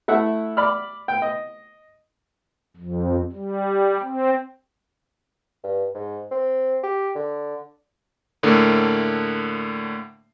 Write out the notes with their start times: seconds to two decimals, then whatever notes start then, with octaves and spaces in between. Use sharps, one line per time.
0.08 A3 E4 E5 F#5
0.57 D5 B5 F6
1.08 G5
1.22 D#5
2.77 F2
3.32 G3
4.03 C4
5.64 G2
5.95 G#2
6.31 C4
6.84 G4
7.16 D3
8.43 A2 D3 A3 A#3